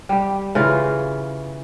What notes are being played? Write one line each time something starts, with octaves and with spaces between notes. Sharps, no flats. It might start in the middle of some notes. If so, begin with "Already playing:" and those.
G3 G4
C#3 E3 F4